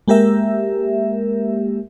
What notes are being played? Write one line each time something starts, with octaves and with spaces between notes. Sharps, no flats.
G#3 A#3 G4 A#4 E5